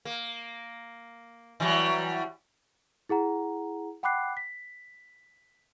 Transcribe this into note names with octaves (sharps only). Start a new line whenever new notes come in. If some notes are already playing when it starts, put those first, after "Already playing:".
A#3
E3 F#3 G3
E4 G#4 F#5 A#5
F#5 G5 B5 D6 F#6 C7
B6